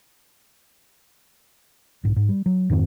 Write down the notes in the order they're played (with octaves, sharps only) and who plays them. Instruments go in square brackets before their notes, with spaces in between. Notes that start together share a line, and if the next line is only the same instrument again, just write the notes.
[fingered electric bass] B1 G#2
G#2
G3
F#3
F2 G#2 D#3 C4